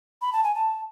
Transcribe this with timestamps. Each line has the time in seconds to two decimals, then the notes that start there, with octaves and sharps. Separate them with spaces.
0.22 B5
0.33 A5
0.44 G#5
0.55 A5